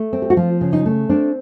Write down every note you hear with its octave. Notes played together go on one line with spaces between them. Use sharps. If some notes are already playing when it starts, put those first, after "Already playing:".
Already playing: A3
C4
G4
F#4
F3 F4
C#3
D#4
A3
C4 D4